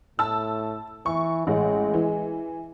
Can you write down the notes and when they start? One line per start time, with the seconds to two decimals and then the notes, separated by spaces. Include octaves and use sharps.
0.19 A2 A5 E6
1.06 E3 C#6
1.47 A1 G#3
1.94 E3